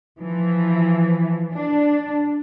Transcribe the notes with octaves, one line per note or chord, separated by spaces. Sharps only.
E3 F3
D4